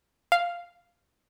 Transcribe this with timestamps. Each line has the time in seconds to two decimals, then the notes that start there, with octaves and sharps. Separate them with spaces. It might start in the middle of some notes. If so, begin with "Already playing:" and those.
0.32 F5